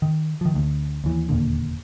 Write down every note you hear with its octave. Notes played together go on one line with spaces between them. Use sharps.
D#3
D#3 F3
D2
D#2 E3
E1 D#2 A#2 D3